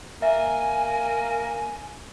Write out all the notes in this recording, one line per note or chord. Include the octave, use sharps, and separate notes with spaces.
A#3 E5 G#5